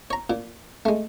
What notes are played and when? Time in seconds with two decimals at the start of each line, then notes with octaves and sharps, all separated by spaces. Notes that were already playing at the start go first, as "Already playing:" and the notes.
0.11 C#5 A#5
0.30 A#2
0.85 G#3 A3